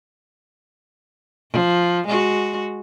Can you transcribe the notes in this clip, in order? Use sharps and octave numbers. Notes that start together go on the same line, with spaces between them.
F3
G#3 F#4